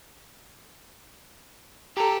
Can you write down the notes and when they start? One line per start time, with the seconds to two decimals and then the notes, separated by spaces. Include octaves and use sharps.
1.97 G4 A4 A#5